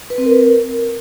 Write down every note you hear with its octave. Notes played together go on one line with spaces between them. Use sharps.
B4
C4
A#4